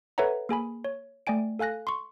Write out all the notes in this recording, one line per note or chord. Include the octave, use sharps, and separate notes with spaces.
A4 B4 C#5 E5 F#5 A#5
A#3 G#4 G#5 B5
C#5
A3 D5 G5 G#5 D7
A4 F5 G#5 F#6 A#6
C6 C#6